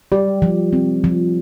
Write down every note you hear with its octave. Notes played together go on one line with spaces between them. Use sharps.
G3 G4
F3
C4
F3